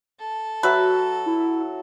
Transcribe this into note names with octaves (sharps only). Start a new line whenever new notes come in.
A4
F#3 F#4 B4 E5
E4